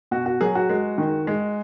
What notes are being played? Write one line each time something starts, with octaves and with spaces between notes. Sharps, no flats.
B2 F#4
F#4
F#3 G#4
F#4
G#3
D#3
G#3